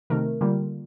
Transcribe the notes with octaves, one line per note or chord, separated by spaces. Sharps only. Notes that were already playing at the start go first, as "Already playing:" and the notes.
C3 D#3 A3 A#4
D3 G3 A#3 F4